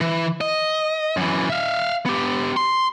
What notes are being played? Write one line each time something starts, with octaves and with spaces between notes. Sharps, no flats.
E3
D#5
F#2 E3
E5 F5
B3 G4
C6